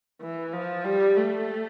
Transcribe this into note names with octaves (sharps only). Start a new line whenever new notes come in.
E3
F3
G3
A3